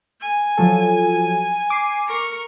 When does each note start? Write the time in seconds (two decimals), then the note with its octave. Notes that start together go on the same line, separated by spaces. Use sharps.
0.21 G#5
0.58 F3 F#3 A4
1.70 D6 C7
2.08 A#4 C#6